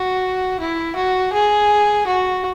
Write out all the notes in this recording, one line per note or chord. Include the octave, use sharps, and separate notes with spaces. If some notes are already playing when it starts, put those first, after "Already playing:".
Already playing: F#4
E4
F#4
G#4
F#4